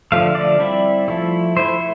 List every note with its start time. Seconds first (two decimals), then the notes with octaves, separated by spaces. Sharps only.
0.12 D3 F3 A3 F5
0.35 D5
0.60 G3 C4 E4
1.08 F3 A3 E4
1.57 A3 E4 C5